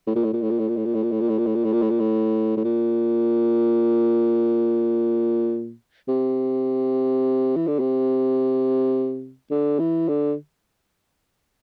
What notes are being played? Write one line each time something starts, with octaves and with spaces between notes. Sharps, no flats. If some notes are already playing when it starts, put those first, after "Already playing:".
A2
A#2
A2
A#2
A2
A#2
A2
A#2
A2
A#2
A2
A#2
A2
A#2
A2
A#2
A2
A#2
A2
A#2
A2
A#2
A2
A2
A#2
C3
E3
D3
C3
D3
E3
D3